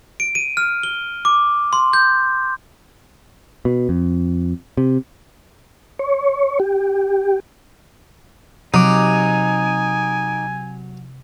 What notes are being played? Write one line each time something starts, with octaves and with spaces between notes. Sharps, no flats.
D7
D#7
F6
G7
D6
C6
G6
B2
F2
C3
C#5
G4
C3 F#3 D#4 G#5 D6